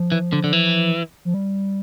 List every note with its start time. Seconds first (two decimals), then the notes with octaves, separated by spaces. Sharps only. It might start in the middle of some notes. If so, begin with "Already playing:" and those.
Already playing: F3
0.12 E3
0.33 D3
0.44 D3
0.53 E3
1.25 F3
1.34 G3